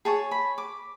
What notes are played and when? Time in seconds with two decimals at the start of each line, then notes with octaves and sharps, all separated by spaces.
0.05 G#4 C#5 A5
0.31 B5
0.58 D6